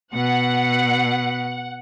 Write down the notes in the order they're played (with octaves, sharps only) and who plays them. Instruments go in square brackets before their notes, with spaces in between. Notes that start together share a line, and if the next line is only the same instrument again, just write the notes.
[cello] B2 [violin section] F#5